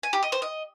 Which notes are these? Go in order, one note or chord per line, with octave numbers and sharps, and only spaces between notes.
G#5
G4
D#5
C5
D#5